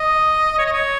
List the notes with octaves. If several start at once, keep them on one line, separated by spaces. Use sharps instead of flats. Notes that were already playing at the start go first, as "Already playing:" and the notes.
Already playing: D#5
C#5
D#5
C#5